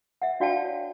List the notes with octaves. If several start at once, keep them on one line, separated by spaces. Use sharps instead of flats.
E5 F#5
D4 F#4 D5 F5 G5 A5
C#5